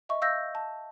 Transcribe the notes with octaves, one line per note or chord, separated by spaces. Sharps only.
D#5 E5 C#6
F5 E6 G6 A#6
A5